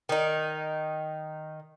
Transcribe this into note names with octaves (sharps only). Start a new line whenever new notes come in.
D#3 D#4